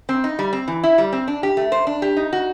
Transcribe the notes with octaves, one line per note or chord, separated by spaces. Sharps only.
C4
D#4
G3
C4
E3
E4
G3
C4
D4
G4
A3
C5
D4
G4
D#4
F#4